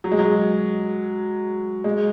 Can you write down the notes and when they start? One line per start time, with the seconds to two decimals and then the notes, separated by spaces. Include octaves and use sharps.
0.04 F#3
0.12 G#3
0.19 F#3
1.84 G#3